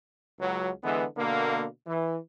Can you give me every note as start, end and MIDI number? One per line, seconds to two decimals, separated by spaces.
0.40 0.70 37
0.40 0.70 54
0.83 1.04 50
0.83 1.04 52
0.83 1.04 56
0.83 1.04 59
1.17 1.65 47
1.17 1.65 50
1.17 1.65 58
1.87 2.17 52